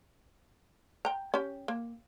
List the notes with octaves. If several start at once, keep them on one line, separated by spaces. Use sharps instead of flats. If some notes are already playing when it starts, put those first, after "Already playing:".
G5 A#5
C#4 G4
A#3